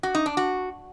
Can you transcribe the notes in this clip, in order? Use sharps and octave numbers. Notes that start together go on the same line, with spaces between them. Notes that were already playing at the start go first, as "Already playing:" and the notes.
F#4
D#4
D4
F#4